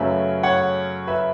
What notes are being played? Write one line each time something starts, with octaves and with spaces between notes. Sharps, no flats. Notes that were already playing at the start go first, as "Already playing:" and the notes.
Already playing: F#2 C#3 F#3 A3 C#4 B4 E5
C#5 F#5
B4 E5